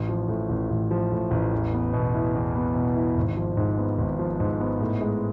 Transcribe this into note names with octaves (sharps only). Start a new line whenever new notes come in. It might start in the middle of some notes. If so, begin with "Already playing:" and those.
Already playing: A1
F3
A2
A1
A1
F3
A2
A1
E2
B3
B2
E4
E2
B3
B2
E4
G#1
F3
G#2
B3
G#1
F3
G#2
B3
A2
G#3